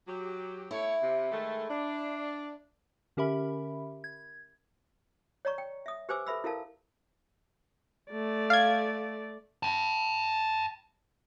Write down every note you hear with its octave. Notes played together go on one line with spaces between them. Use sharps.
F#3 G4
A3 E4 C#5
C3
D#3 G#3 A3
D4
D3 C#4 G4 A#4 E5 B5
G#6
C#5 D5 A#5 C#6
G5
E5 D#6
G4 B4 C5 G#5 D6 E6
A4 B4 E5 B5 E6
E4 A4 A#4 F5 A5
A3 D5
F5 G#6
G5 A5